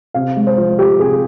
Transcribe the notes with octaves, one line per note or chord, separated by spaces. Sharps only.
C3 F5
G#3
C5
F3
F3 G4
C3 G#4